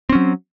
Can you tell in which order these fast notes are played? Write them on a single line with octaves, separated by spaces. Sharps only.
C4 C#4 F#3